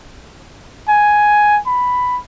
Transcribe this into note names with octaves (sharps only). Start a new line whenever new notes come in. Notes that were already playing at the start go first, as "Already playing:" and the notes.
G#5
B5